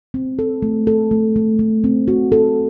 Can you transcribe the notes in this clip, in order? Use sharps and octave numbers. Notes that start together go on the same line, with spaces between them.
C4
A4
A3
A4
A3
A3
A3
C4
F#4
A4